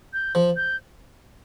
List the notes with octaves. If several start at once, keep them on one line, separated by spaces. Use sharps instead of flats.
G6
F3
G6